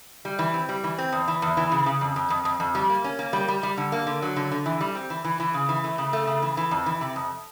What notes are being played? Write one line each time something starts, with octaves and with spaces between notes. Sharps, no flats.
G3
E3
C4
G3
E3
C4
E2
E3
E2
E3
C#3
C#3
F2
F2
F2
F2
F2
G3
A#3
C#4
A#3
G3
G3
G3
D3
A#3
D3
F#3
D3
D3
E3
G3
C4
E3
E3
E3
C#3
E3
A3
C#3
A3
C#3
E3
E3
F2
E3
C3
F2